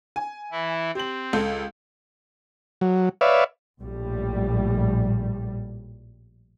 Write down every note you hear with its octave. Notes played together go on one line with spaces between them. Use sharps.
G#5
E3 E4
C4 G4 F#7
C#2 A4 G6
F#3
B4 C#5 D5 E5 F5
A#1 A2 G3